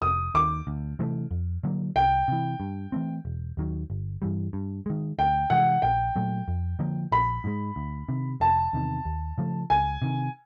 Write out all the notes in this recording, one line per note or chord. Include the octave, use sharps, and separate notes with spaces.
F1 D#6
D#2 D#3 D6
D2
C3 E3 A3
F2
D3 F#3 A#3
C2 G5
C3 E3
G2
E3 A3 C4
E1
D#2 D#3 F#3
G1
G2 E3 G3
G2
D#3 G#3
D2 G5
C3 E3 G#3 F#5
A#1 G5
A#2 F#3 A3
F2
D3 F3 A#3
A#1 B5
G#2 E3 G#3
D2
C3 D#3
F1 A5
E2 C3 D#3
D#2
C#3 F3 A3
C#2 G#5
C3 D#3